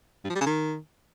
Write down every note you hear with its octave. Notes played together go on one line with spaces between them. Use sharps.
G2
F3
G3
C#3
D#3